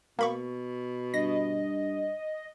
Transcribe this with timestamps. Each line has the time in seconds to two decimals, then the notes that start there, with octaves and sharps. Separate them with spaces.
0.19 B2 A#3 B5 C#6
1.14 G2 D#5 A#6